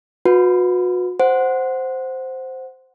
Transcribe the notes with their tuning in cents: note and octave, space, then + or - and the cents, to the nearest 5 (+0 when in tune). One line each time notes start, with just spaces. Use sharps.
F#4 -35 B4 +0
C5 +0 F#5 +0